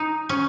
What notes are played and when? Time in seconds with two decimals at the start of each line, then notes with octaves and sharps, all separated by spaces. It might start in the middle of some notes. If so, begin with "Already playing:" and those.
Already playing: D#4
0.29 C#4